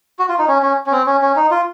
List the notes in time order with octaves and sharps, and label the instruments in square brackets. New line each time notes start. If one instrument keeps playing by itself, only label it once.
[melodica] F#4
F4
D#4
C#4
C#4
C#4
C4
C#4
C#4
D#4
F4